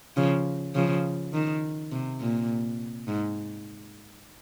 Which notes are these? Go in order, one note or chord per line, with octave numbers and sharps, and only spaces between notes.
C#3 F3
C#3 F3
D#3
C3
A#2
G#2